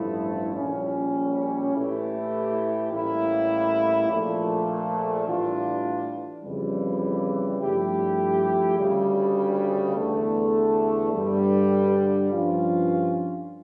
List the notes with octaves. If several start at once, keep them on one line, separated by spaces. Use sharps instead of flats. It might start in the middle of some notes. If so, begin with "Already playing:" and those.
Already playing: A1 G2 F3 A3 E4
A#1 A#2 G3 C#4
A2 E3 A3 E4 G4
A1 A2 G3 A#3 E4
A#1 A#2 A3
A2 E3 G3 D4 F4
F2 C#3 E3 G3
G2 F3 A3 E4 G4
D2 C#3 G3
E2 D3 A3
G2 D3 G3
G2 F3 C#4 F4